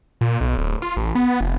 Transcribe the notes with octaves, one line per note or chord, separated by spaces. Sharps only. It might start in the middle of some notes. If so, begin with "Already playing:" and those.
A#2
B1
D1
F4
A1
B3
F1